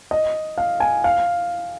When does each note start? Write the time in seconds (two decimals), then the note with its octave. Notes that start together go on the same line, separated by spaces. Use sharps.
0.11 D#5
0.58 F5
0.80 G#5
1.04 F5